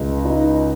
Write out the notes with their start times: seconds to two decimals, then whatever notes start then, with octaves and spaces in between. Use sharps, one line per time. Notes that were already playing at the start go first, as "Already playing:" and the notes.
Already playing: C#2
0.24 D#4